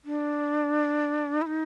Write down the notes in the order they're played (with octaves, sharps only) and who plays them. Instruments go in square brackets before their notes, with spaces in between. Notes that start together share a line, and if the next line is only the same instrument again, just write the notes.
[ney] D4
E4
D#4